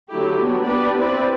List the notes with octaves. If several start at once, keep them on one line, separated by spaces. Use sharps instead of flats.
D3 F#3 A3 E4 G4
F#3 B3 D4
B3 D4 G4 B4 D5
C4 E4 B4 D5